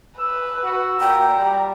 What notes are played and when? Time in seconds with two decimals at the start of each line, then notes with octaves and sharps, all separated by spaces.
0.19 B4 E6
0.64 F#4
1.00 A#2 G5 A#5
1.38 G3